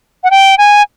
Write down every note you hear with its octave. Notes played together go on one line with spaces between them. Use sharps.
F#5
G5
G#5